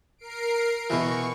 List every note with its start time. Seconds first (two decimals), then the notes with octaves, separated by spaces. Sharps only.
0.18 A#4 C7 D7
0.90 B2 E3 C#6